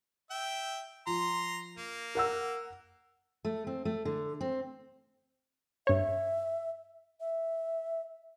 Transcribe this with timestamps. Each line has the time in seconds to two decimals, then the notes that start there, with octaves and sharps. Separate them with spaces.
0.31 E5 G5
1.07 F3 A#5 C6
1.78 A#3
2.15 A#4 F#5 E6
3.45 A3
3.67 C4
3.85 A3
4.05 D3
4.41 C4
5.87 G2 C#5 E5
7.20 E5